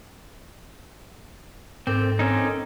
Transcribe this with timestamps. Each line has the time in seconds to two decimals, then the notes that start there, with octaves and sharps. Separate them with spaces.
1.87 G#2 C4 A4 A#4 D6
2.19 C4 C#4 D#4